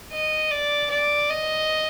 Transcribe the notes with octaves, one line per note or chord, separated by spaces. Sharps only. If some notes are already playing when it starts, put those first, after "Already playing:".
D#5
D5
D5
D#5